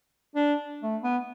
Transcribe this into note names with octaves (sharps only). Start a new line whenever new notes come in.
D4
A3
B3